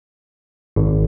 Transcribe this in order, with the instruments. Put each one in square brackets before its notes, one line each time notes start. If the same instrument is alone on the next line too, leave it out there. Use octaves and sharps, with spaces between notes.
[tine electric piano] G#1